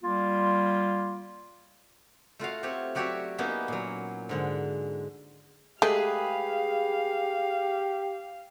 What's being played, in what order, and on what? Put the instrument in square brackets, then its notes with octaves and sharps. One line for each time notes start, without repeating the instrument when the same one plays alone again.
[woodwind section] G3 A#3 F4
[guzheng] A3 F4 F#4 F5
A3 C4 G4 C#5
F#3 F#4 G4 C#5 D5 E5
A#3 B3 C#4 D#4 E4
A#2 F#3
G#2 D3 G#3
[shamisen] G#3 A3 [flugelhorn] G4 [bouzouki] G#4 B4 [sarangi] F5